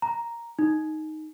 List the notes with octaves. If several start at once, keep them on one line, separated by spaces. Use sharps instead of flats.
A#5
D#4